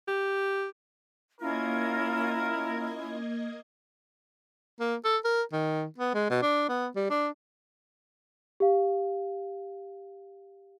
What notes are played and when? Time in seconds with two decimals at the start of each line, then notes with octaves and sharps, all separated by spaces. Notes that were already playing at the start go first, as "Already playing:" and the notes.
0.08 G4
1.40 A#3 C#4 E4 F4 A#4 D#5 G#6
4.80 A#3
5.05 A4
5.24 A#4
5.52 D#3
5.98 B3
6.15 G#3
6.30 B2
6.42 D4
6.69 B3
6.96 G3
7.10 D4
8.60 G4 F5